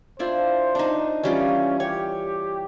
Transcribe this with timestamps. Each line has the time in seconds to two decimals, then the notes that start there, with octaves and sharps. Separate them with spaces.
0.19 D4 E4 F4 C5
0.75 D4 D#4
1.23 E3 G3 C#4 F4
1.80 G4 C#5